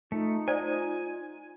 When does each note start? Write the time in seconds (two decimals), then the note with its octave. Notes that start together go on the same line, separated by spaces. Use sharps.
0.12 A3 D#4 F4
0.48 C5 D5 G#5